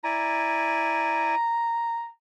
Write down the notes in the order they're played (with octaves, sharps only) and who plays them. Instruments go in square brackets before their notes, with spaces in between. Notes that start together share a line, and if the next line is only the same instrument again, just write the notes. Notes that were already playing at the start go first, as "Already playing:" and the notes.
[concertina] E4 D5 G#5 [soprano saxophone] A#5